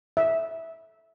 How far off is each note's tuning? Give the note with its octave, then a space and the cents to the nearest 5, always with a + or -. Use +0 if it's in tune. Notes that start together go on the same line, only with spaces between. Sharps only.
E5 -10